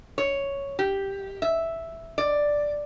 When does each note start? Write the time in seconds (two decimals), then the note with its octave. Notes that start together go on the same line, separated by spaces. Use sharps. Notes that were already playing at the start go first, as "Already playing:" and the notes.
0.18 C#5
0.79 G4
1.42 E5
2.18 D5